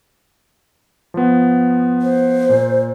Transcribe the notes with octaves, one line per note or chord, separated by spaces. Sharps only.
F3 B3
C5
A#2